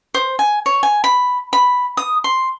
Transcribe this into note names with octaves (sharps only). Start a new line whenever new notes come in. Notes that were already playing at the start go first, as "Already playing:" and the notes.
C5
G#5
C#5
G#5
B5
B5
D#6
C6